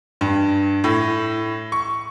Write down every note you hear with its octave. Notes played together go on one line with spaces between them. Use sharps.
G2
A2
C#6